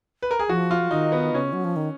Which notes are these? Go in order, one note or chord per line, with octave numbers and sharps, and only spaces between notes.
B4
A#4
G#4
F3 F#4
F4
D#3 D#4
B3
C#3 C#4
F#3
F3
D#3